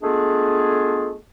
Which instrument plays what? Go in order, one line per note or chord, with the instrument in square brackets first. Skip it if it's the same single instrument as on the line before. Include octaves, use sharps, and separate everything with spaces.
[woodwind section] G#3 A3 B3 D4 F4 G#4